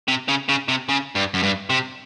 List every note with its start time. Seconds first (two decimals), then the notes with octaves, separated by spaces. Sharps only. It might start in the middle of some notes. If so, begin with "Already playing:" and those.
0.08 C3
0.28 C#3
0.49 C#3
0.68 C3
0.89 C#3
1.15 G2
1.34 F#2
1.43 G2
1.70 C3